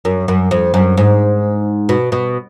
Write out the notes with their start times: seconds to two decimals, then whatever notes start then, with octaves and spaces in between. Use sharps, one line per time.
0.05 F#2
0.28 F#2
0.51 F2
0.74 F#2
0.98 G#2
1.89 B2
2.12 B2